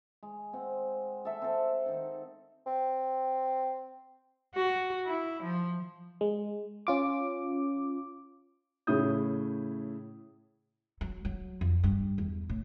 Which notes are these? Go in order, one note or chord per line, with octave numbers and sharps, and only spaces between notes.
G#3
C4 F#5
A4 E5
C4 A4
D#3 D#4
C4
F#4
E4
F3
G#3
C#4 F4 D6
A2 C#3 E4 C#5 D#6 G6
F#3
F#3
F2
G2
E2
A2